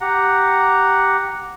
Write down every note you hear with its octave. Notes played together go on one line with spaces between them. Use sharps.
G4 F#5 A#5